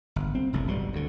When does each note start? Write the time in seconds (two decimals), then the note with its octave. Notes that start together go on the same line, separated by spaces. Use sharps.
0.16 G1
0.35 C4
0.53 F1 C2 A2
0.67 G1 B2 D3 G3
0.93 D2 D3